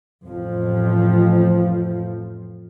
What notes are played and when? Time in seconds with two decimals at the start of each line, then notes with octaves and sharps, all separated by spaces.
0.27 A1 F2 F3